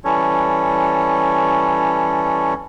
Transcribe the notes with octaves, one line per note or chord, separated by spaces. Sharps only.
E3 G3 C#4 A4 C#5